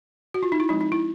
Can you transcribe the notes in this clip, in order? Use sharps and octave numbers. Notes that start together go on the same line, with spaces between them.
F#4
F4
D#4
E4
F3 G#3 C4 D#4
D#4
E4